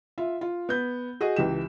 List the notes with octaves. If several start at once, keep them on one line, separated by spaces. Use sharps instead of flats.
F4 E5
F4
B3 G6
F#4 G#4 D#5
C#2 E3 G4 E7